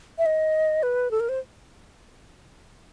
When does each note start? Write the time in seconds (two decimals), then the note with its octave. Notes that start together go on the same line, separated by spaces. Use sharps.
0.18 E5
0.26 D#5
0.83 B4
1.11 A4
1.20 A#4
1.29 C5